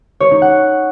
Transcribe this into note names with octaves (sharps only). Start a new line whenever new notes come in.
C#5
D#4
F#5